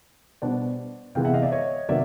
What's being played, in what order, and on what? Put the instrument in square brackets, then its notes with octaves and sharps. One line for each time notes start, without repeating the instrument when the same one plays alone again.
[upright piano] B2 G3 B3 D4 C5 D5
C3 E3 G#3 B3 F5 G5
E5 F#5
D#5 F5
D5 E5
C#5 D#5
C3 D#3 F#3 A#3 D5 E5